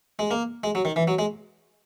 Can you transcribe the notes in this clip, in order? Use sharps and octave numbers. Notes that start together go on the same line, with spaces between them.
G#3
A#3
G#3
F#3
D#3
E3
F#3
G#3